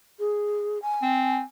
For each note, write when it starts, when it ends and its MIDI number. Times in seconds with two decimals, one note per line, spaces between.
0.19 0.81 68
0.82 1.42 80
1.02 1.39 60